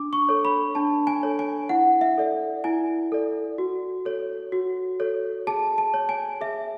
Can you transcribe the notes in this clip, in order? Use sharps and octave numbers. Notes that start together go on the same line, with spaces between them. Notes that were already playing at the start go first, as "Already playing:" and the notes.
Already playing: D4 D6
C#6
A4 C#5
B5
D4 A5
G#5
A4 C#5
G#5
E4 F#5
E5
A4 D5
E4 G#5
A4 D5
F#4
A4 C#5
F#4
A4 C#5
G#4 A5
A5
C#5
G#5
G#4 E5